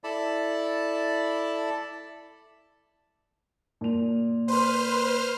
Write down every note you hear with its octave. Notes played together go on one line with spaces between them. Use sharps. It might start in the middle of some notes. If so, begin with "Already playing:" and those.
E4 A4 D5 A5 B5
A#2 F7
B4 C5 C6 F6